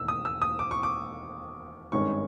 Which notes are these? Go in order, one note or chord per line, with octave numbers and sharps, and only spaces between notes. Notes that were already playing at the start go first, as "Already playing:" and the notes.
Already playing: E1 D#2 D#3 E6
D#6
E6
D#6
D6
C#6
D6
G#1 G2 D#3 G#3 C#4 C#6